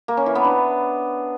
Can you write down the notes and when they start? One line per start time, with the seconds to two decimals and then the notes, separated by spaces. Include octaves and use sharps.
0.08 A#3
0.17 C#4
0.26 E3
0.35 B3
0.44 D4